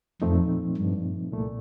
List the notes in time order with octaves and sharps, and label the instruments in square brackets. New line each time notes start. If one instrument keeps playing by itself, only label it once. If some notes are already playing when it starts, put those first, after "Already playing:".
[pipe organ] F2 [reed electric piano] A#2 F3 A3 C4 D#4
[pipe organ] G2
[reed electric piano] C2 A#2 A3